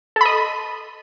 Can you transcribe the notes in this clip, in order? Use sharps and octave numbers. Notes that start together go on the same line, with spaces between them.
A4 D#5 B5